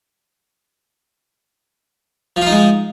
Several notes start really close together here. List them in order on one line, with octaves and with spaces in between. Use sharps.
F3 F4 D#4 G#3